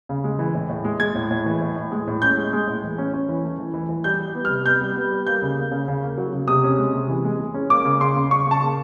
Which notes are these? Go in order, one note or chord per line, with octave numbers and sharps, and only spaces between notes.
C#3
G#3
E3
A2
A2
G#3
G#3 G#6
A2
A2
E3
A2
A2
G#3
A2
C#4 G6
G#3
G#3
A2
E3
C#4
C#4
E3
A3
E3
E3
E3
G3 G6
G3
B3
C3 F6
B3 G6
G3
B3
G3
A#3 G6
C#3
A#3
C#3
C#3
A#3
F#3
C#3
C3 D#6
C#4
G#3
C3
E3
G#3
G#3
C#4
A#3 D6
C#3
C#3 C6
C#3
C#3 C#6
C#3 A5
A#3